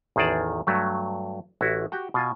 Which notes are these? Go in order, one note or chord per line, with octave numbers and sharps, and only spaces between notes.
A1 E2 D#3 G#4 D5 A5
G2 F#3 A3
A1 E4 F#4
F#4 G4 G5
B2 F4 G#5